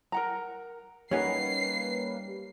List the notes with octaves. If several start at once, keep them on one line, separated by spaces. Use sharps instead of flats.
A#4 F#5 A#5
G3 A#3 C#4 D#4 B4 C#5 F#5 C7